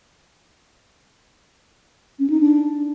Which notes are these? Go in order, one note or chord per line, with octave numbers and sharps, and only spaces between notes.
C#4
D#4
D4